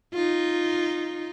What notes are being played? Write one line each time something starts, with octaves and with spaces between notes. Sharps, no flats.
D#4 F4